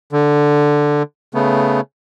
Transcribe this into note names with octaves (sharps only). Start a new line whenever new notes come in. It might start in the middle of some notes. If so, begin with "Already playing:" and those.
D3
C#3 A3 B3